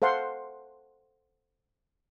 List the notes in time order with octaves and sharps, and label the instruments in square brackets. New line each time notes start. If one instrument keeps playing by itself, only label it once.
[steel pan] A4 C5 F5 F#5 C6